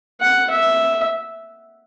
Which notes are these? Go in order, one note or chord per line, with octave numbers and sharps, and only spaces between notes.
F#5
E5